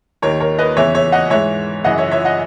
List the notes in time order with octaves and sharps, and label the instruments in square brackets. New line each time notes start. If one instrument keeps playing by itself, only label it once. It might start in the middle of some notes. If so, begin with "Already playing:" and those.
[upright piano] D#2 D#3 A#4 C#5
A#4 C#5
B4 D#5
E2 C#3 E3 C#5 E5
C#5 E5
D#5 F#5
G#2 E3 C#5 E5
F#2 C#3 E3 D#5 F#5
C#5 E5
C#5 E5
D#5 F#5